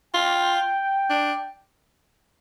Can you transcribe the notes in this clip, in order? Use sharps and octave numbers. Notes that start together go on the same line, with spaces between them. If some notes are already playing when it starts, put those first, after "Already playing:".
F4 G5
D4